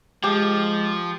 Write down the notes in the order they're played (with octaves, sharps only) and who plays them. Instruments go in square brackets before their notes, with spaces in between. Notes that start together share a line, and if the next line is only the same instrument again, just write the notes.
[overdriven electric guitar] F3 [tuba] G#3 [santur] G4